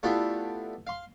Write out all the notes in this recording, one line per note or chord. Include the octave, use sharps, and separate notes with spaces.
A3 B3 D4 E4 F4 G4
F5 C6